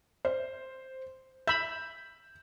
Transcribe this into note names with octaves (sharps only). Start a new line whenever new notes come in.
C5
E5 B5 G6